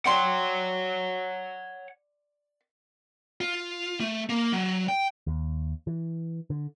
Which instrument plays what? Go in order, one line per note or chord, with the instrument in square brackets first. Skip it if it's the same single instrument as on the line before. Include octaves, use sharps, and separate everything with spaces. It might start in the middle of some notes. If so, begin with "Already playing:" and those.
[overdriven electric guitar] C#5 F#5 [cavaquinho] D5 G5 C6
[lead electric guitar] F4
A3
A#3
F#3
G5
[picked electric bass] D#2
E3
D3